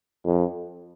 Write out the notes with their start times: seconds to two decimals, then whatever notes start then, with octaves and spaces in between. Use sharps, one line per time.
0.25 F2